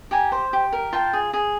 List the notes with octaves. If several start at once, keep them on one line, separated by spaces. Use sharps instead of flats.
G4 G#5 A#5
C5
G4
A#4
F4 G5 A5
G#4
G#4